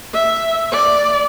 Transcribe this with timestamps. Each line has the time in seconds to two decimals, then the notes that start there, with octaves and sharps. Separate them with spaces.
0.13 E5
0.72 D5